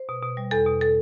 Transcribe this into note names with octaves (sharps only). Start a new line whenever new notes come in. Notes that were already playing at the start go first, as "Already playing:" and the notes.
Already playing: C5
B2
B2
G3
E2 A4
B2
A4